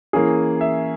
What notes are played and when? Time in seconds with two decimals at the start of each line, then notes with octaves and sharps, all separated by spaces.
0.13 E3 A#3 C#4 G#4
0.61 E5